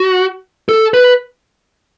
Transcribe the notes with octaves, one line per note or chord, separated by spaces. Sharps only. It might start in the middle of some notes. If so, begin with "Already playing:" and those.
Already playing: F#4
A4
B4